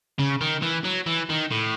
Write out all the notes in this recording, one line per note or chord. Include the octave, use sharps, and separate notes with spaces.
C#3
D#3
E3
F#3
E3
D#3
A2